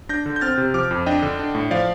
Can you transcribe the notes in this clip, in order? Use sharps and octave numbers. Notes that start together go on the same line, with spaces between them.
D4 G6 A#6
D3
G6
C4 F6 A6
C3
F3 D6 F6
F2
D4 D#5 G5
D3
D4
A2
F3 D5 F5